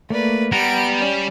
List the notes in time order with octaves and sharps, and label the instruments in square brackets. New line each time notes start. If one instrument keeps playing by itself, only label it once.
[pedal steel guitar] A3 A#3 [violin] B4 D5
[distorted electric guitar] G3 [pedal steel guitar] B3 F#5 A#5 [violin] D7
[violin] C#4 D5